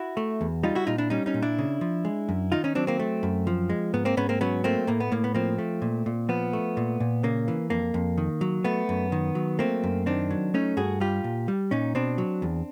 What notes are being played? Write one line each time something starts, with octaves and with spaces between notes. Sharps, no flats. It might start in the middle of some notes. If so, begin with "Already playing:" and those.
Already playing: E4 F#4
A3
E2
G3 D#4 F4
E4 F#4
A#2 D#4 F4
D4 E4
G3 C#4 D#4
C#4 D#4
A#2
D4 E4
C#3
F3
G#3
F#2
D#3 D#4 F4
C#4 D#4
F#3 C4 D4
A#3 C4
A3
F#2
F3
G#3
G#2 B3
A#3 C4
G#2 B3 C#4
A#3 C4
F#3 B3 C#4
A3 A#3 C4
A2 A#3
B3
A2 A#3
B3
F3 A#3 C4
A3
A#2
A#2
F3 B3
A3
A#2
A#2
C#3 A#3
E3
F2 A#3
F2
D#3
F#3
A3 B3
F#2
D#3
F#3
A3 A#3 C4
F#2
D#3 C4 D4
F#3
A3 C#4 D#4
G2 F#4 G#4
G3 F4 G4
A#2
G3
A#2 C#4 D#4
B2 C4 D4
F#3
E2